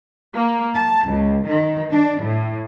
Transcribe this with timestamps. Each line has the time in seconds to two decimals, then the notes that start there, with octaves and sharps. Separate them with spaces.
0.33 A#3
0.74 A5
1.06 C#2
1.45 D#3
1.90 D4
2.21 A2